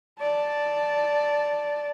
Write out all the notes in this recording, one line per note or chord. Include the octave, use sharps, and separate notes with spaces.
D5 A5